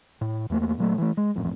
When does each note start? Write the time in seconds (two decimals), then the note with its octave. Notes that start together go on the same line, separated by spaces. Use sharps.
0.21 A2
0.50 E2 A3 A#3
0.78 A#2 F#3 A3
0.98 E3 A3
1.17 G#3
1.36 D#1 A1 F2